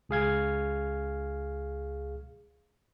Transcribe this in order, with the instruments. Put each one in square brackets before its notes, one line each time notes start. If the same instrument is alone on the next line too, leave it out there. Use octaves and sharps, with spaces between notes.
[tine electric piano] C#2 G#4 F5 G#6